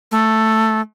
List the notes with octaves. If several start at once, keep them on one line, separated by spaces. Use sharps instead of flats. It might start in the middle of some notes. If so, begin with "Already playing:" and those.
A3